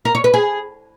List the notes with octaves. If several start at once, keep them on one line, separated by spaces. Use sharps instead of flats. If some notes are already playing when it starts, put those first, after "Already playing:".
A#4
C#5
B4
G#4